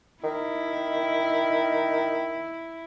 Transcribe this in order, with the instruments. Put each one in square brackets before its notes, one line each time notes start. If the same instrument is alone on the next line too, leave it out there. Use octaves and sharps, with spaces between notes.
[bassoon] D#3 [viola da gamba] E4